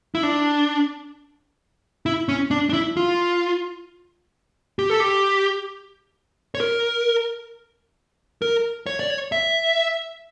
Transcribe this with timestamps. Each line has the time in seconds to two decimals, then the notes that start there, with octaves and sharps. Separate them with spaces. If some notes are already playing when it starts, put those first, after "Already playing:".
0.15 E4
0.23 D4
2.06 E4
2.29 C#4
2.51 D4
2.69 D4
2.73 E4
2.97 F4
4.79 G4
4.90 A4
5.00 G4
6.55 C#5
6.60 A#4
8.42 A#4
8.86 C#5
8.99 D5
9.10 C#5
9.32 E5